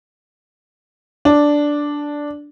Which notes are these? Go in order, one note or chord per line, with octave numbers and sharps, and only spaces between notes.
D4